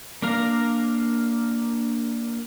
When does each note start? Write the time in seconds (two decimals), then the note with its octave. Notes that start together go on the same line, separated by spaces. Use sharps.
0.22 A#3 D4 A#4 F5 A#5